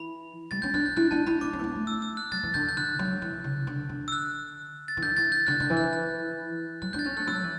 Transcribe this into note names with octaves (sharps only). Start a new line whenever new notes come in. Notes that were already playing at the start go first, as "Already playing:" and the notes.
Already playing: E3 B5
G3 A6
C#4 G6
D4 F#6
G6
E4 F#6
D4 A5
E4 B5
D4 D6
C#4
A3
B3
A3
E6
E6
F#6
F#3 A6
E3
D3 G6
G6
D3 F#6
F#3
E3
C#3
D3
D3
E6
F#6
A6
E3
D3 G6
E3 A6
G6
D3 F#6
D3 G6
E3
F#6
F#6
F#3 F#6
D4 G6
A6
C#4 G6
A3 F#6
F#3 E6
F#6
E3